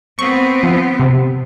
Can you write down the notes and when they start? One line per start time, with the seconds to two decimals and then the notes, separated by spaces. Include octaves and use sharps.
0.19 B3 C4 C#6
0.63 F3
1.00 C3